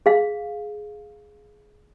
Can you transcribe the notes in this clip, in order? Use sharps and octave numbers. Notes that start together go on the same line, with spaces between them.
G#4 F5